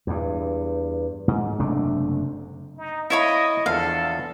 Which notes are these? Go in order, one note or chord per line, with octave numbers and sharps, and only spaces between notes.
E2 G2
G#2
F#1 C3 A3 D4
D#4
E4 C5 C#5 D#5 F5 B5
E2 D3 F3 A4 F5